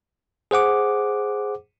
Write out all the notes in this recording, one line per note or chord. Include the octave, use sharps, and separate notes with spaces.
G#4 C5 F#5 D6